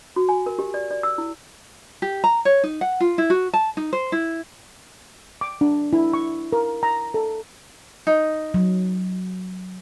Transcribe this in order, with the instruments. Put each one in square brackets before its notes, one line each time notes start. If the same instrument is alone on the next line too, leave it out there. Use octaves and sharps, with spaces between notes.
[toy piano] F#4
G#5
A#4
G4
D5
D5
E6
E4
[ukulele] G4
A#5
C#5
D#4
F#5
F4
E4
F#4
A5
D#4
C5
E4
[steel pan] D6
D4
E4
C#6
A#4
A#5
A4
[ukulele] D#4
[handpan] F#3